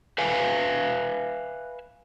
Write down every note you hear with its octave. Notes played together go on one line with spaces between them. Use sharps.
B4 E5 F5 G#5